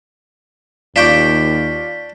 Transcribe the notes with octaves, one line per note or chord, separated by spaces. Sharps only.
D#2 D4 F4 G5 C#6 D6 B6